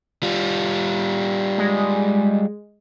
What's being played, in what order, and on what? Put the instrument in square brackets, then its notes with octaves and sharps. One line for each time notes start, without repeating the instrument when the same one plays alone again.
[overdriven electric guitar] G3 F4
[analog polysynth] G#3